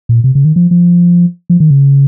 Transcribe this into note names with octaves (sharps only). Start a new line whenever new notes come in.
A#2
C3
C#3
D#3
F3
F3
F3
D#3
C#3